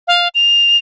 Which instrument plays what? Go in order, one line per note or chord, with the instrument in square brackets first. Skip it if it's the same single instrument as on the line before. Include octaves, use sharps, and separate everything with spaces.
[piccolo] F5
F7